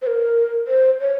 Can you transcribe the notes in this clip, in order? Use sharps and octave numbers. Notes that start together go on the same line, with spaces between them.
C5
A#4
C5
C#5